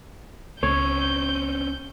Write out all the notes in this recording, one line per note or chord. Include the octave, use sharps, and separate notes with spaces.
C#2 C4 C#4 C#5 G6